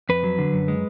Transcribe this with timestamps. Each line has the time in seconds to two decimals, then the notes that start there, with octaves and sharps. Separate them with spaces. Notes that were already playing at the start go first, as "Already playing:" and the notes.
0.09 F2 B4
0.24 F#3
0.38 D3
0.53 F#2
0.68 G#3